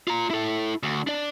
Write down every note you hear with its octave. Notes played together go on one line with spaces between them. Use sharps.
F4 A#5
E4 A4
D2
D4 D5